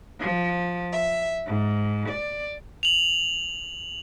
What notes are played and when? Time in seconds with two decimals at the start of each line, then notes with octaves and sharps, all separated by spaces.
0.19 F3
0.91 E5
1.45 G#2
2.10 D5
2.83 F7 F#7